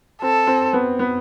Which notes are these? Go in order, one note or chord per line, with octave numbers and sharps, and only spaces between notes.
C4 A4
C4
B3
B3